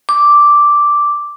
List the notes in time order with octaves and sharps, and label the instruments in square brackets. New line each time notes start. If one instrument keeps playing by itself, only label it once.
[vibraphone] D6